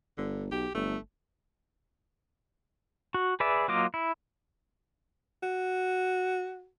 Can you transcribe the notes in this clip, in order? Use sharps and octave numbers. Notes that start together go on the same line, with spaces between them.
G1 D3
B1 G4
G1 A3
F#4
G#4 B4 D5 E5
F#3 A#3 F4 D#5 D6
E4
F#4